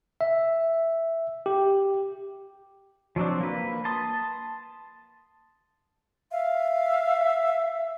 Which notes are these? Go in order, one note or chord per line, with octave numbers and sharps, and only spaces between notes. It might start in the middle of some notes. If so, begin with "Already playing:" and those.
E5
G4
F3 F#3 C4 D4
A#3 B4
A5 C6 D#6
E5 F5